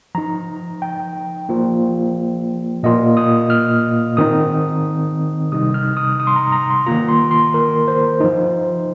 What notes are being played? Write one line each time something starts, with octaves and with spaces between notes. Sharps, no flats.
F3 D#4 A#5
G5
F3 A#3 F4
A#2 A#3 F4 D#5
D#6
F6
D#3 C4 D#4 D#6
C3 G3 D#4 D#6
F6
D#6
D#6
C6
A#5
A#5
C6
D#3 A#3 F4 A#5
C6
C6
A#4
C5
F3 D#4